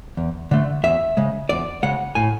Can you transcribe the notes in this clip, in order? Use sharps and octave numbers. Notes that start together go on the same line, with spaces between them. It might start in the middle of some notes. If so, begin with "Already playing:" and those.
E2
D3 A3
E2 E5
C#3 G#3
E2 D5
C#3 G#3 F#5
A2 G#5